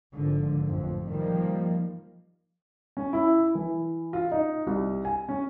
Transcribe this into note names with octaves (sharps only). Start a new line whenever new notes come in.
G#1 D3 F3
A1 F2
D#3 F3 G3 A#3
C#4
E4
E3
F4
D#4
C2
G#5
C#4